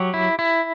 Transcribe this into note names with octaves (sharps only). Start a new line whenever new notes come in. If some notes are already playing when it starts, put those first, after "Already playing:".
Already playing: F#3 G4
E4
E4